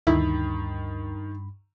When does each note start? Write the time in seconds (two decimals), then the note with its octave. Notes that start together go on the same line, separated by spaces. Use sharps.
0.07 D2 G2 D#3 E4 B5